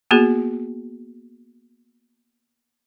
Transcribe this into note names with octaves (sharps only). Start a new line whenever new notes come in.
A#3 B3 F#4 G#4